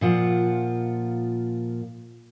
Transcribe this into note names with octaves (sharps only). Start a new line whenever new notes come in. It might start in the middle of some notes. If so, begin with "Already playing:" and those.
A#2 F3 F4 F#5